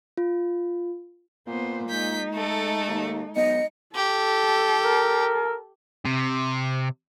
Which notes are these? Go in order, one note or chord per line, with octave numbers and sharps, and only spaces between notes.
F4
A#2 B3 C5
G#3 D#4 G6 B6
A3 A4
D#2
B1 D#5 C#7
G4 A4
A#4
C3